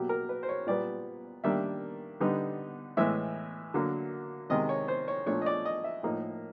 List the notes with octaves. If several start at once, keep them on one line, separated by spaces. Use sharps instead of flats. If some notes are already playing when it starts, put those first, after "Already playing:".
Already playing: B2 F#3 A#3 G4
A#4
B4
C5
C#5
A#2 G3 B3 D5
D#3 G3 A#3 D4 E5
D3 G3 B3 D#4
A2 E3 G#3 E5
D3 F#3 A#3
C3 D#3 G#3 D#5
C#5
C5
C#5
A#2 F3 A3 D4 C#5
D#5
D5
D#5
E5
A2 F3 A#3 D#4